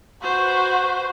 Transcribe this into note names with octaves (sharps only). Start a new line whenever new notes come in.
F#4 B4 C5